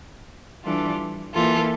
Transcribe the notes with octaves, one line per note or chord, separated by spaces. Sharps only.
E3 G3 D4 F4 A4
E3 A#3 F4 A4